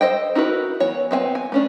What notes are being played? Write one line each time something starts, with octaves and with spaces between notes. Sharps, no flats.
A4 C5 D#5 G5
D#4 E4 F#4 A#4 B4
E3 B3 C#5
B3 C4 E5 G#5
G#5
A3 C#4 D4